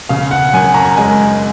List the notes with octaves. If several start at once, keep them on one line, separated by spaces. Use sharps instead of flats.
C#3 F5
F#5
F#2 G#5
A#5
G#3 G#5